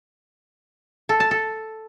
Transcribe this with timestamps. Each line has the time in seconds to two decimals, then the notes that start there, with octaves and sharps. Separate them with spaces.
1.09 A4
1.20 A5
1.31 A4